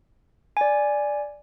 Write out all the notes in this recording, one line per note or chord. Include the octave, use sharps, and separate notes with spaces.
D5 G#5